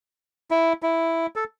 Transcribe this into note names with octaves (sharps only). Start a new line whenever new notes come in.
E4
E4
A4